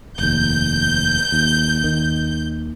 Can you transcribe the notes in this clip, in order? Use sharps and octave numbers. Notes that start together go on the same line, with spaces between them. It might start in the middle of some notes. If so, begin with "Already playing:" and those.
F1 D#2 G6
D#2
D#2 D#3